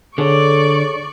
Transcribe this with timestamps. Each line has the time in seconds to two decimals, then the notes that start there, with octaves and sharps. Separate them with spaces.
0.18 D3 G#4 A4 C#5 D5 C#6